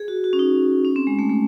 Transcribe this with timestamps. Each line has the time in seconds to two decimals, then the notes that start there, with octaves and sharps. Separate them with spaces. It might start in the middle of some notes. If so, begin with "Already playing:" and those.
Already playing: G#4
0.08 F#4
0.24 F#4
0.33 C#4
0.39 D#4
0.85 C#4
0.96 C4
1.07 G#3
1.19 A3
1.30 A3